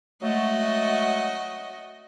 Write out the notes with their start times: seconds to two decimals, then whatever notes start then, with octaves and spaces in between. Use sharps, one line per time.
0.23 F#3 G#3 A3 F#4 D#5